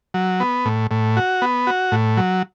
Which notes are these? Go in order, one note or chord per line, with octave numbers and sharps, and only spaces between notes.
F#3
B3
A2
A2
F#4
B3
F#4
A2
F#3